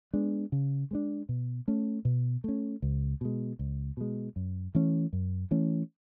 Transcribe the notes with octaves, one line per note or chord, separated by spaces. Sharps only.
G#3 B3 D4
C#3
G#3 B3 D4
B2
A3 C#4
B2
A3 C#4
C#2
B2 G#3
C#2
B2 G#3
F#2
E3 A3 C#4
F#2
E3 A3 C#4